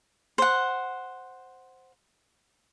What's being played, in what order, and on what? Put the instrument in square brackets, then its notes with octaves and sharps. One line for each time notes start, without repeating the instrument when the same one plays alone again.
[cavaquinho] C5 F#5